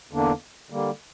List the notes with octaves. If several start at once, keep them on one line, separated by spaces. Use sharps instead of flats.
E2 D3 A#3 D4
D3 G3 A#3